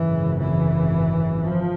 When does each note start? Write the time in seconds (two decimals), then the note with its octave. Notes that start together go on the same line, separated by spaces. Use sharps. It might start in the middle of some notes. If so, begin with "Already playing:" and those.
Already playing: G#1 F#2 C#3 E3
0.39 E3
1.43 F3